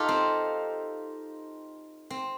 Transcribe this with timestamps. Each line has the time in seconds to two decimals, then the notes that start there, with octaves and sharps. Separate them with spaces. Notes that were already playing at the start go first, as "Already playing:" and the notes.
Already playing: D#4 F4 G4 A4
0.09 C4
2.10 C4